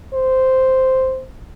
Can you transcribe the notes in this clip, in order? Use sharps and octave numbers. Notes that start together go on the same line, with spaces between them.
C5